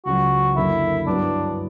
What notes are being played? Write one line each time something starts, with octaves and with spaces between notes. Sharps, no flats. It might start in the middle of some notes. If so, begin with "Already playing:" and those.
C#2 C#3 F#3 F#4
F#2 D3 A#3 D4 E4
G2 F#3 B3 D4 E4